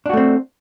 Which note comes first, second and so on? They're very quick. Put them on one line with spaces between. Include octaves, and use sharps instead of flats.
D4 F#4 A3 C4